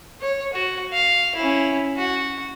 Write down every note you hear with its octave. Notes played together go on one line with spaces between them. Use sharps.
C#5
F#4
F5
C#4 E4
F#4